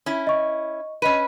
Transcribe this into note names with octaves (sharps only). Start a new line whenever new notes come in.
C#4 E4
D#5 C#6
C#4 B4 D#5 D#7